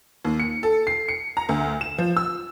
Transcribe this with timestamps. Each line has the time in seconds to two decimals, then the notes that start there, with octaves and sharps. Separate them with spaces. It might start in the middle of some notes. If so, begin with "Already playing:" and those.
0.25 D#2
0.40 C#7
0.63 A4
0.87 C7
1.08 C#7
1.37 A#5
1.49 D2
1.81 E7
1.98 F3
2.17 E6